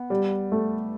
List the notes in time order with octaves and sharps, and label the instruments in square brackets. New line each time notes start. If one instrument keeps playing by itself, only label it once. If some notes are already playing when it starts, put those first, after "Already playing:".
Already playing: [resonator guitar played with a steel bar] B3
[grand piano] G3
A3